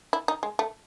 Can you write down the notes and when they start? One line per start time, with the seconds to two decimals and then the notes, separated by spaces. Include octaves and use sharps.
0.13 E4
0.28 D#4
0.43 G#3
0.59 A3